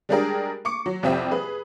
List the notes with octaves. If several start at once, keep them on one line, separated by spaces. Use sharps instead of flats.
G3 G#3 D4 G4 G#4 A#4
C#6 D6 C#7
F#3
C2 F2 C4 G4 E5
G#4 B4